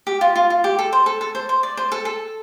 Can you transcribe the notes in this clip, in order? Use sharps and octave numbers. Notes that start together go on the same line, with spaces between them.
G4
F4
F4
F4
G4
A4
C5
A4
A4
C5
C5
D5
C5
A4
A4